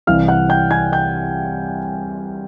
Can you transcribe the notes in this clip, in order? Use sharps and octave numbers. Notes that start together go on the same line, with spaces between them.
C2 C3 E3 F5 F6
F#5 F#6
G5 G6
G#5 G#6
G5 G6